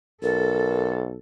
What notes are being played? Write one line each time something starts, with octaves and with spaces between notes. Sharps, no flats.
B1 A4 A#4